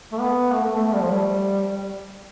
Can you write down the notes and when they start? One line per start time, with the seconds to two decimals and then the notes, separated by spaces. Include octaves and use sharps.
0.12 A3
0.20 B3
0.53 A3
0.64 A3
0.75 A3
0.87 A3
0.94 G3
1.02 F3
1.10 G3